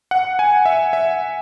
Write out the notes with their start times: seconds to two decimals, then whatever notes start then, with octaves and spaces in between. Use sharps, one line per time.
0.11 F#5
0.39 G#5
0.66 E5
0.93 E5